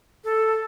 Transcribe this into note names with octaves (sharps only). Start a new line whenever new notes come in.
A4